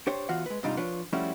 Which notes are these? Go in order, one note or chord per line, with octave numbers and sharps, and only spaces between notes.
D4 G4 C5 C#5
E2 E3 F4 F#4 F5 F#5
G#3 B4
G#2 C3 G3 D4 D#4 F4
F3 D4 F4 B4 C#5
F3 G3 A3 C#4 E4 F#4